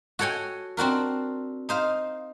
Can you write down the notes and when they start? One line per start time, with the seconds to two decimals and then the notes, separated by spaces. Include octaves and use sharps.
0.19 F#4 A4 C#5 G5 G#5
0.77 C4 D4 F#4 A#4
1.69 D#4 C5 F5